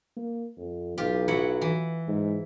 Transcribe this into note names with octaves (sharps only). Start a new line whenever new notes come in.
A#3
F2
B1 F4 G4
F#3 E4 F#5
E3
G#2